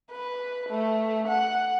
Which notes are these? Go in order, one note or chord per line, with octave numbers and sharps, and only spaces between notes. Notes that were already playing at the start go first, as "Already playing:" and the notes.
B4
A3
F#5